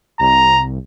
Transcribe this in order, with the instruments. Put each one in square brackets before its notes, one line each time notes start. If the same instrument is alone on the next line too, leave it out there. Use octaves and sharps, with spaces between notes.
[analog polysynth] C2 [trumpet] A#5